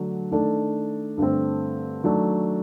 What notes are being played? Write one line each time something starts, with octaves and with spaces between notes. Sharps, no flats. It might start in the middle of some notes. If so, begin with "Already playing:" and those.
Already playing: D3 F#3 A3 D4
D#3 A3 D4 A4
G2 D3 A3 C4
D#3 F#3 A3 D4